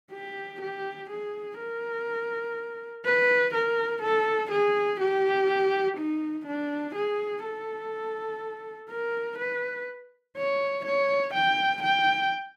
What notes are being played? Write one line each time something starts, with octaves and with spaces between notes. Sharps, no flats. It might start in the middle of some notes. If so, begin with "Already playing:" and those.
G4
G4
G#4
A#4
B4
A#4
A4
G#4
G4
D#4
D4
G#4
A4
A#4
B4
C#5
C#5
G5
G5